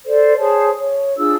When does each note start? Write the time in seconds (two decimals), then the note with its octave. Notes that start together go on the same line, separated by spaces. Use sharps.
0.05 A4 C5 D5
0.37 G#4 C5 C#5 A5
0.78 C#5
1.18 D4 F4 G#4 E6